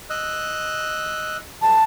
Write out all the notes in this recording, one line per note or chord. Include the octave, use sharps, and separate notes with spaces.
D#5 E6 F#6
F#2 G3 A5